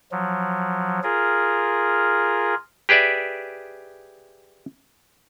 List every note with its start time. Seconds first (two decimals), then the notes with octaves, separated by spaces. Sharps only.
0.12 F3 F#3
1.03 F4 G#4 A#4
2.89 G4 G#4 B4 D5 E5